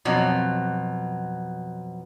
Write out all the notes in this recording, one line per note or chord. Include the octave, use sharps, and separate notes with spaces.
F2 B2 F#3